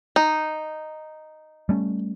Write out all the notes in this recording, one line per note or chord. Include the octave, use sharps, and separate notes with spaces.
D#4
G3 A3 C#4